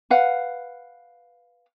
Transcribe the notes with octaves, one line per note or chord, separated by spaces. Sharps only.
B4 F5 F#5